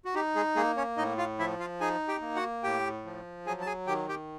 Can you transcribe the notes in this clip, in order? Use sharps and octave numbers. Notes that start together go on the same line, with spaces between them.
F#4
D#4 G4
G#3 G#4
G#3 A#3 G#4
C#4 C#5
A2 D#4 D#5
F4 F5
F3 E4 E5
F4 F5
D#4 G#4 G#5
G4 G5
A#3
F#4 F#5
A2 G4 G5
F3
F#3 G#4 G#5
A5
G#4 G#5
D#3 G4 G5
G4 G5